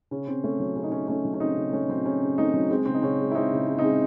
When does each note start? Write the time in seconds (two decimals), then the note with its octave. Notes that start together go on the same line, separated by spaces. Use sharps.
0.11 C#3 C#4
0.27 C#3 C4
0.44 A3 C#4
0.60 F#3
0.76 C#3 C#4
0.83 D#4
0.92 C#3 C#4
1.08 A3 C#4
1.25 F#3
1.34 C#4
1.40 C#3 C4 D#4
1.57 C#3
1.73 A3 C#4
1.89 F#3 C4
2.05 C#3 C#4
2.22 C#3
2.38 A3 C4 D#4
2.54 F#3
2.70 G#3 C4
2.86 C#3 C4
2.94 D#4
3.03 C#3 C#4
3.19 G#3
3.31 E4
3.35 G#3 C4 D#4
3.52 C#3
3.67 C#3
3.78 C4 D#4
3.84 G#3